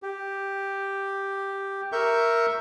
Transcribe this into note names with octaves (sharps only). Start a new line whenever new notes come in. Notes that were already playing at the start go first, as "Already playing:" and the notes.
G4
A#4 E5 C#6 G6